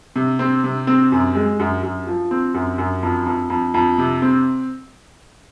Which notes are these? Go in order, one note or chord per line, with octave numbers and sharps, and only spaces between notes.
C3
C4
C3
C4
F#2
G#3
F#2
F#2
F3
C4
F#2
F#2
F2
F2
F2
F2
C3
C4